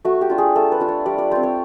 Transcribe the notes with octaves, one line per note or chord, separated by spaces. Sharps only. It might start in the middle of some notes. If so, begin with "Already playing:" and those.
A3 F#4
G4
D4 F4
G#4
A3 A4
B4
D4 F4
C#5
G3 D5
D5
C4 F4 C5
C#5